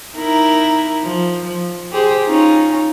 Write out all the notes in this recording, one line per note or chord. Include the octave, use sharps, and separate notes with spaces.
D#4 E4 A#4
F3
F3
G4 G#4 C5
C#4 D#4 F4